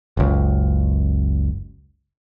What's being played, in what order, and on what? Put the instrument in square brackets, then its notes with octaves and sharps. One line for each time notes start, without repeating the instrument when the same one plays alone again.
[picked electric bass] F#1 C#2